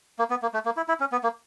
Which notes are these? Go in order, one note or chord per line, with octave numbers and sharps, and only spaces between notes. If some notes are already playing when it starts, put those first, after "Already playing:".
A#3
B3
A#3
A3
A#3
E4
E4
C#4
B3
A#3